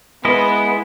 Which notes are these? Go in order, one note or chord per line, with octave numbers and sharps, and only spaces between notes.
G#3 B3 E4 D#5